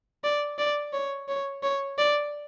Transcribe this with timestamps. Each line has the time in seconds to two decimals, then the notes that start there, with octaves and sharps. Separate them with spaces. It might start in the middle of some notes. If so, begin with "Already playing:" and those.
0.24 D5
0.59 D5
0.93 C#5
1.28 C#5
1.63 C#5
1.98 D5